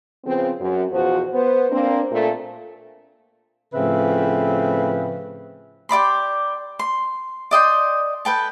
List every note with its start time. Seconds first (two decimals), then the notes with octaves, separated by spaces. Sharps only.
0.24 C#3 F3 B3 C4
0.60 F#2
0.92 E2 B2 F3 F#4 C5
1.33 B3 C5
1.70 A#3 C4 D4
2.11 A#2 A3
3.74 A2 C#3 F3 C4 B4 E5
5.89 G4 D5 B5 C6
6.79 C6
7.51 D5 D#5 G5 C6
8.25 A4 B4 G5 A5